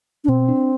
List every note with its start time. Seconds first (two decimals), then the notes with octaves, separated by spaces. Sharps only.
0.24 D4
0.28 B2 C4
0.49 D4